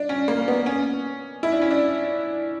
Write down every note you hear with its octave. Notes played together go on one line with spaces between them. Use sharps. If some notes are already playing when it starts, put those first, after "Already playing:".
Already playing: D4
C#4
A#3
B3
C#4
E4
D4
C#4
D4